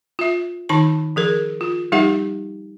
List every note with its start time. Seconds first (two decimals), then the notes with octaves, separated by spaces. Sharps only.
0.19 F4 E5
0.69 D#3 D#4 A5 B5
1.16 F3 G#4 A#4
1.61 F4
1.92 F3 G3 D#4 G4 E5 F#5